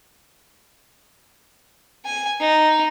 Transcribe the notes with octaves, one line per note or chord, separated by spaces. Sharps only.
G#5
D#4